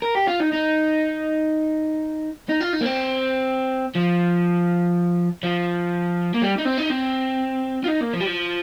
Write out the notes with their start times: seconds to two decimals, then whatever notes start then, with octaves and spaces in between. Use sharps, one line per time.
0.02 A#4
0.15 G4
0.27 F4
0.40 D#4
0.52 D#4
2.49 D#4
2.60 F4
2.73 D#4
2.81 A#3
2.86 C4
3.95 F3
5.43 F3
6.34 A#3
6.42 G3
6.58 D#4
6.66 C4
6.78 D#4
6.91 C4
7.84 F4
7.88 D#4
8.01 A#3
8.13 F3
8.20 G3
8.26 F3